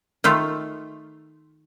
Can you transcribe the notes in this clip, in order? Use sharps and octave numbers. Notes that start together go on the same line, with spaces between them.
D#3 A3 F4